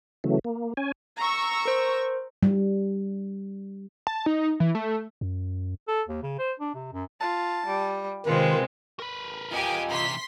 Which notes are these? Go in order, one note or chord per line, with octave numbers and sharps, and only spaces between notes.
C#3 E3 F#3 A3
A#3
C#4 G#5
A#5 C#6 E6
A#4 C5
G3
A5
D#4
E3
A3
F#2
A4
D#2
C#3
C5
D4
C3
F#2
F4 A5
G3
C3 D#3 G#3 C4 F4 B4
A#4 B4
F4 G4 D#5 G#5
C3 E3 C6 B6